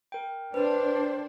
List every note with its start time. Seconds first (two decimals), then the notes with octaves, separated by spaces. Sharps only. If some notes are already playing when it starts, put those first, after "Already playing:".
0.12 A#4 G5
0.54 D4 B4 C5